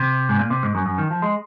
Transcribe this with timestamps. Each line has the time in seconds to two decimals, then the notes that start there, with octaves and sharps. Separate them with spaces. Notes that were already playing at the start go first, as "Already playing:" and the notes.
Already playing: C3
0.29 G#2
0.39 A#2
0.50 C3
0.63 G#2
0.75 F#2
0.86 F#2
0.98 D#3
1.10 F3
1.22 G#3